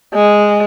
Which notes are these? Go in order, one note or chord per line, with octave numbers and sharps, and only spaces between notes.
G#3